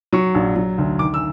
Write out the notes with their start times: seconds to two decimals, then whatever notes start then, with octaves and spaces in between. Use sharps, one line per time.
0.13 F#3 C#6
0.35 A#1
0.56 F#3
0.78 D2
0.99 D#3 D6
1.14 E6